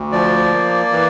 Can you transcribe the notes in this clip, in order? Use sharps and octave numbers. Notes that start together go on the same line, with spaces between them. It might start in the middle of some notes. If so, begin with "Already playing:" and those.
Already playing: D2
F3 D5
A#3
E3